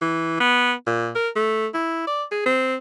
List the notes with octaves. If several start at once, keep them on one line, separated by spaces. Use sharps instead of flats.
E3
B3
A#2
A#4
A3
E4
D5
G#4
C4